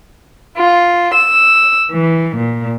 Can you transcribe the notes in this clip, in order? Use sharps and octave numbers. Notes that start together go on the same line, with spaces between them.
F4
E6
E3
A#2